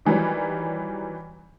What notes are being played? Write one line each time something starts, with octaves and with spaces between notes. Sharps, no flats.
D#3 E3 F#3 G3